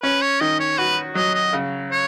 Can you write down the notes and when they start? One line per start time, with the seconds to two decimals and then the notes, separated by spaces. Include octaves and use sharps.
0.03 C#4 B4
0.22 C#5
0.41 D#3 D#5
0.60 C#5
0.78 F#4 B4
1.15 F#3 D#5
1.34 D#5
1.53 C#3
1.92 C#5